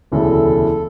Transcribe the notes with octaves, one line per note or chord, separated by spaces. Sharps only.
E1 D2 C#3 E3 A4